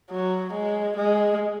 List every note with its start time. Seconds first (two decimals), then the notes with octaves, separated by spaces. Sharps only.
0.11 F#3
0.54 G#3
0.97 G#3